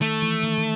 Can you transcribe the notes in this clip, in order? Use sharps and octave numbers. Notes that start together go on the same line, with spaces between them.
D#3 A3
E3
D#3
D#3